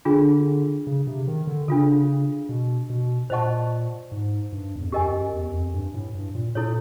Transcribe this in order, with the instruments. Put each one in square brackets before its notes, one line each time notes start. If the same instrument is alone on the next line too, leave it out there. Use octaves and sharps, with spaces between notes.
[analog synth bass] D3 [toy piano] D4 F4 G#4
[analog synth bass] C#3
C3
D#3
D3
[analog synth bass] C#3 [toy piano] D4 F4 A4
[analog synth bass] B2
B2
[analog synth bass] A#2 [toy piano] C5 D#5 F#5 A5 C#6
[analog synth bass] G#2
G2
E2
F2
[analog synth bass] F#2 [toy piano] G4 A#4 D#5 G#5
[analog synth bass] F#2
E2
F2
G2
A2
G2
A#2
[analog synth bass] A#2 [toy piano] E4 A4 C#5